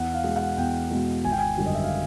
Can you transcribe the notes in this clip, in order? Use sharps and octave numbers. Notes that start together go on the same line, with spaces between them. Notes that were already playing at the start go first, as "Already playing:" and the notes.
Already playing: E2 F#5
F5
B2 G#3
F#5
E2 G5
B2 G#3
G#1 G#5
G5
G#5
F#2 D3 G3
D#5
E5
F5